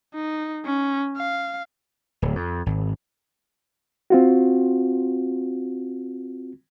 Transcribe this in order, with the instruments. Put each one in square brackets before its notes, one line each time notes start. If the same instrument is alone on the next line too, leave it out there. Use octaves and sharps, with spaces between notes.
[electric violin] D#4
C#4
F5
[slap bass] D1
F2
G#1
[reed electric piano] C4 F4 F#4